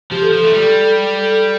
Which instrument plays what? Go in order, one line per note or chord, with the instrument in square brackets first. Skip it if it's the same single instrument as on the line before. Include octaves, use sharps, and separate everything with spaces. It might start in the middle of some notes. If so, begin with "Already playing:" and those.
[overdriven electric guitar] F3 [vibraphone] G4
[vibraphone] A4
[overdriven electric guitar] F3
A3
G3
[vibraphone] A4